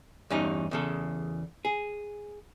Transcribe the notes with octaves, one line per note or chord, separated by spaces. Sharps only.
E2 G2 C#4 D#4
E2 C#3 A4
G#4